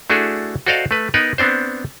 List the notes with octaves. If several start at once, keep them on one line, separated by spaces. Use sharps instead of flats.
A3 D4 E4 F#4 G#4 A4
F#4 A4 C5 D5 D#5 F5
A3 B4
B3 D#4 A#4 B4
B3 C4 D4 C5